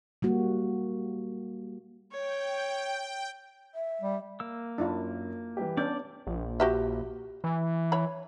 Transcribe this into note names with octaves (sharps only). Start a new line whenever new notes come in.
G3 A#3 F#4
C#5 G5
E5
G3
A#3 E6
F#2 D4 E4 F4
E3 G3 G4
B3 C#4 D4 D5 G6
A#1
F#4 G4 E5
E3
C#5 B5